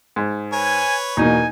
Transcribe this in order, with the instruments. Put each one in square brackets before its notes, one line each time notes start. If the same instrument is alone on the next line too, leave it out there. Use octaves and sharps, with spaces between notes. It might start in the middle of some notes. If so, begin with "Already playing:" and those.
[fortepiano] G#2
[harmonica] B4 C#5 [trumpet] G#5
[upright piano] E2 B2 A#3 [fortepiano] D#4 [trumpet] G#5